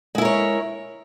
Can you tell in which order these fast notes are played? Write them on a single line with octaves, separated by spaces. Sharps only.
G#3 E4 A#4 C#5